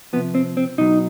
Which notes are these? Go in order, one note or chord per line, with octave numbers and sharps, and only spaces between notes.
C3 F3 B3
C4
C4
B2 F#3 D#4